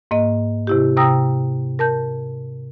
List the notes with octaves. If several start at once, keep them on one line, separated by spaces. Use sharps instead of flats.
G#2 A#3 D#5
C3 E4 G4
C3 G5 A#5 D#6 E6 A#6
A#4 A5 G6